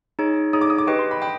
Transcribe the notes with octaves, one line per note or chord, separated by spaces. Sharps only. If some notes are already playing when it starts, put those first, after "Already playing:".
D#4 G#4 C#5
D#4 G#4 C#5 D#6
D6
D#6
D6
G4 B4 D#5 G5 C#6
C6
B5
G5 B5